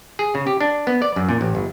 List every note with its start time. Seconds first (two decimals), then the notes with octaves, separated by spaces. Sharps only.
0.19 G#4
0.35 C#3
0.47 G4
0.61 D4
0.87 B3
1.02 D5
1.16 F#2
1.29 A#2
1.41 A1
1.55 G1